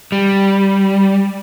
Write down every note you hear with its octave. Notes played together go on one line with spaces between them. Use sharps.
G3